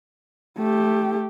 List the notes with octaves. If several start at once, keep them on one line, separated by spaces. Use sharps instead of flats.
A3 G4